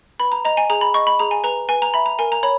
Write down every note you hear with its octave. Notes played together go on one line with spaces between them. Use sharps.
B4 B5
A#5
D#5 A#5
G#5
G#4 A#5
B5
D#5 C#6
B5
G#4 A#5
G#5
B4 A#5
B4 G#5
A#5
E5 B5
A#5
A#4 G#5
A#5
C#5 B5